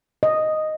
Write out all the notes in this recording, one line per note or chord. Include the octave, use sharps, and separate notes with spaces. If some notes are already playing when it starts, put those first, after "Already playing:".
D#5